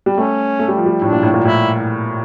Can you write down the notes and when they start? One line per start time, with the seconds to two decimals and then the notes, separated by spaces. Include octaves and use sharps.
0.06 G3
0.17 A3 C#4
0.59 A3
0.68 G3
0.77 F3
0.86 G3
1.02 A2 D4
1.13 A#2
1.23 A2
1.34 A#2
1.44 A2 E4